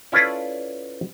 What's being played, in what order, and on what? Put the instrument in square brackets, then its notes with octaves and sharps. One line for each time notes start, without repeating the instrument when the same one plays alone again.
[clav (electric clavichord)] C#4 E4 F4 A4 B4 D5